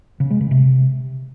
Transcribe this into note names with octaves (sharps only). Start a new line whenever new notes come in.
C#3
G#3
C#3
C3